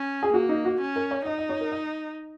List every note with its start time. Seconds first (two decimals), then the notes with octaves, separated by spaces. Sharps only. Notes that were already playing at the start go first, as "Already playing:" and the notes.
Already playing: C#4
0.23 G#4
0.33 A#3 F#4
0.49 D#4
0.65 F#4
0.80 C#4
0.96 A#4
1.11 C#5
1.25 D#4 D#5
1.38 D#5
1.49 C#5
1.61 A#4
1.72 D#5